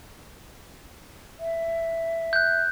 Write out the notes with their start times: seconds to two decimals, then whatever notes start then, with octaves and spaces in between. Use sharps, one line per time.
1.39 E5
2.33 F#6 G6